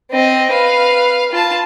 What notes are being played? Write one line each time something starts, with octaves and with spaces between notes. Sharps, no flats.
C4 D#5
B4 F5
F4 A5